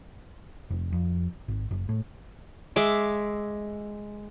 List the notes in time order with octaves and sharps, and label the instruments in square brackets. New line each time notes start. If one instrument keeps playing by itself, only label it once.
[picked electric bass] F1
F2
G#1
F#1
A2
[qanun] G#3 E5 D6